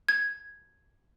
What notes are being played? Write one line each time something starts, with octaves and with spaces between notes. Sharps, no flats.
G#6